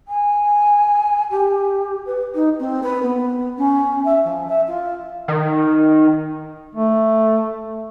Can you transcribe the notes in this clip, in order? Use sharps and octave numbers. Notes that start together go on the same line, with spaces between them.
G#5
G4
B4
D#4
C4
B4
B3
C#4
E5
F3
E5
F4
D#3
A3